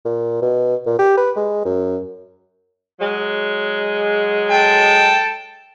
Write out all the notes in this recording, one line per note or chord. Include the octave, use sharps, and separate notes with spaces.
A#2
B2
A#2
G4
B4
G#3
F#2
F#3 G#3
A4 G5 A5